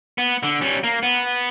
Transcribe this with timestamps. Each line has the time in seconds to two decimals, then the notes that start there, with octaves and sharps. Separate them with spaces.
0.18 B3
0.43 D3
0.61 G3 C#4
0.84 A#3
1.03 B3